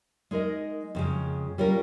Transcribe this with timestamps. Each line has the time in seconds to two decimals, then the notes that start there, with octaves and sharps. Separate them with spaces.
0.31 G#3 D#4 A#4 D#5
0.95 F2 C#3 G#3
1.58 G3 C#4 F4 A#4